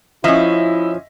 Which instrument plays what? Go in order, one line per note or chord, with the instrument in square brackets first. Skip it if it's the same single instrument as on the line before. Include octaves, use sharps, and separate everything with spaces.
[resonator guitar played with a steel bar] F3 C#4 [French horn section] E4 [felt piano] D#5 E5